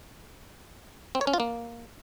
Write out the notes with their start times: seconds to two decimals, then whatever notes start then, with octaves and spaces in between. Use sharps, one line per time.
1.15 C4
1.21 C#5
1.27 C#4
1.33 F4
1.40 A#3